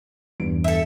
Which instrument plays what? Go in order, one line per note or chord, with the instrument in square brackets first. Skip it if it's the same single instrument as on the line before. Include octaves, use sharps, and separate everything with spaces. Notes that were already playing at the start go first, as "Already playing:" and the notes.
[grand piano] E2 G2 D7
[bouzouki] A4 E5